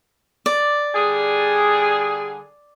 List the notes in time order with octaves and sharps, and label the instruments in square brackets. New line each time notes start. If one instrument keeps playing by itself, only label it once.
[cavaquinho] D5
[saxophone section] D3 G3 G#4